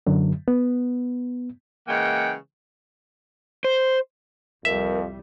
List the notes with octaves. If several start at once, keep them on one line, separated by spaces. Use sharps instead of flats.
F#2 D3 F#3
B3
C#3 E3 G#3 A#3 F#5 G5
C5
C2 F2 G3 A#4 E5